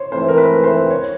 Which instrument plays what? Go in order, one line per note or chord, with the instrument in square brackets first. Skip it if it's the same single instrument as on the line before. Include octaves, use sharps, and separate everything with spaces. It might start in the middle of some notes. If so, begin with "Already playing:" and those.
Already playing: [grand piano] C5 C#5
[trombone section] G#2 E3 A3 C4 [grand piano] C5
[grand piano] A#4
B4
C5
C#5